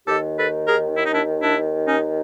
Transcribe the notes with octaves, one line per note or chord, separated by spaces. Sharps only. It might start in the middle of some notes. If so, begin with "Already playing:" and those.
D#2 D#3 G4 A4
A4 B4
G#4 A#4
E4
D#4
D4 E4
D4 E4
C#4 D#4